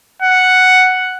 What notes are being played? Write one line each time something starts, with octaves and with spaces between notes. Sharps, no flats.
F#5